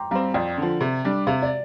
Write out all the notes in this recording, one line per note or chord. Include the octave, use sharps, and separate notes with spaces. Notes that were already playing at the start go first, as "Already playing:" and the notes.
Already playing: G5 A#5 C6 D6
G3 C4 F5 A#5
F2 D5 G5
D3 F3
C3
G3 D4
C3 F5
D5